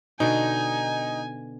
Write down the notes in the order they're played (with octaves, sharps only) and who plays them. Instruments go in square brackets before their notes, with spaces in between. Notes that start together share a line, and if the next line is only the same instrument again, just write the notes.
[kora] B2 D3 [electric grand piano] D#4 [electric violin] G#5